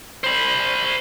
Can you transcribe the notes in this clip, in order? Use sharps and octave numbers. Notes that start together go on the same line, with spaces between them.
C5 B5